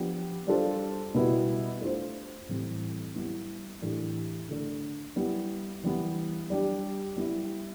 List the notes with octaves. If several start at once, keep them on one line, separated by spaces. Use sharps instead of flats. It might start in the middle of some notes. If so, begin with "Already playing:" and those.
Already playing: F3 B3 D4 G4
G3 D4 F4 A4 C5
B2 G3 B3 E4 B4
A3 D4 F4 C5
A2 E3 G3 C4
G3 B3 E4
A2 E3 A3 D4 G4
D3 A3 D4
G3 B3 E4
E3 G3 B3
G3 D4 G4
G3 B3 E4